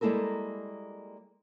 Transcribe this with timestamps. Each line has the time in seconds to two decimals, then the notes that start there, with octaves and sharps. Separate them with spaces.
0.01 G3 G#3 A#3 E4 A4 A#4